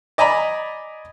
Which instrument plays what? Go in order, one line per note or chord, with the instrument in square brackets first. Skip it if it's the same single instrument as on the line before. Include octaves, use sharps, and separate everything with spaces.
[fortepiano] D5 D#5 G#5 A#5 B5